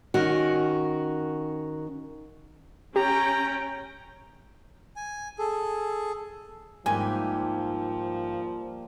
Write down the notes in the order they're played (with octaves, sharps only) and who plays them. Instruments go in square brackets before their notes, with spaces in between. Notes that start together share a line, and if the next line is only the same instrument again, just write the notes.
[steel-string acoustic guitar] D#3 C#4 F#4 A#4
[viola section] C#4 G5 [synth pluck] G4 [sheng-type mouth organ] A#5
[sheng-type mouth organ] G#5
G#4 A4
[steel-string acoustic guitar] G#2 D#4 [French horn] F3 [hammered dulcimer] G3 A#3 E5 [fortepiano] G#5